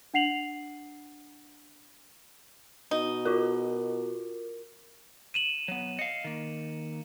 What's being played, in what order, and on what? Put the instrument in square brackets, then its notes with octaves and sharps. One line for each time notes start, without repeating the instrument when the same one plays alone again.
[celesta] D4 F#5 C7 F7 F#7
[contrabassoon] B2 [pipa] D#4
[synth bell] F4 F#4 A#4
[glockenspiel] D#7 E7 F#7
[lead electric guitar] F#3 B3
[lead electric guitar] D#5 F5 [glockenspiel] C#7
[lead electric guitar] D#3 A#3